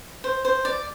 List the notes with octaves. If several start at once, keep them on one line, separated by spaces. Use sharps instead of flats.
C5
C5
D5